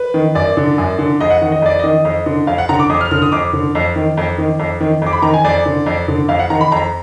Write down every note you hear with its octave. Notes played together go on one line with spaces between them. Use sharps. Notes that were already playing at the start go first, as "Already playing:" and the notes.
Already playing: B4
D#3
F#2 D5
D3
F#2
D3
F2 D#5
F#5
D#3
D#5
F2 D5
D#3 D#5
F2
D3
F2 F5
F#5
D3 A#5
D6
F2 D#6
F6
D3 F6
D#6
F2 D6
D3
F2
D#3
F2
D#3
F2
D#3
F2 D6
B5
D#3 A#5
G#5
F2 D5
D3
F2
D3
F2 F5
F#5
D#3 A#5
B5
F2 A#5